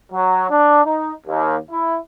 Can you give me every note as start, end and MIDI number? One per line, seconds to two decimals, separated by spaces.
0.12 0.49 54
0.49 0.81 62
0.84 1.12 63
1.27 1.55 39
1.70 1.97 64